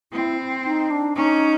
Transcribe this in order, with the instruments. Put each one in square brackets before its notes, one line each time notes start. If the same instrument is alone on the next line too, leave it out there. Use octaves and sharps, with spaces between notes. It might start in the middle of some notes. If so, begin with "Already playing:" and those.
[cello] C4 [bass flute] E4
[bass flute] D#4
D4
[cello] C#4 [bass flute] D#4